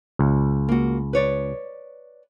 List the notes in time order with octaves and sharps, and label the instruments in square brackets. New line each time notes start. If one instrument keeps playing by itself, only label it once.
[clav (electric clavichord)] C#2
[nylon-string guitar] A#3 F#4
B4 C#5 D5